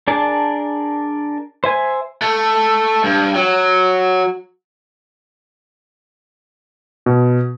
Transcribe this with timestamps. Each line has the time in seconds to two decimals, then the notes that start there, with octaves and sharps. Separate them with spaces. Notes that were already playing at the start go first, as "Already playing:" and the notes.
0.08 D4 G#4 A#4 D5 A5
1.64 C5 E5 G#5
2.22 A3
3.04 G2
3.35 F#3
7.06 B2